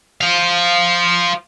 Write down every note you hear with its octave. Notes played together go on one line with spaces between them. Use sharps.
C5 F5